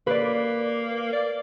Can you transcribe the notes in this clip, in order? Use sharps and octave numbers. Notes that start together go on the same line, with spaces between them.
A#3 B4 D5
D5